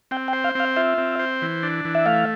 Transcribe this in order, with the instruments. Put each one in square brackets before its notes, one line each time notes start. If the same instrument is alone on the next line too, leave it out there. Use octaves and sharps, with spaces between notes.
[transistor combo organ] C4 [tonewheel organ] G5
[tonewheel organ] G5
[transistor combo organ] C5
[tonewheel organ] F5
[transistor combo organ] C4 [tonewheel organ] F5
[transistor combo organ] F4 [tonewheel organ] E5
[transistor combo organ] C4
C5
E3
D4
E3
[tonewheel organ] E5
[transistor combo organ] A3 [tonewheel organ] F5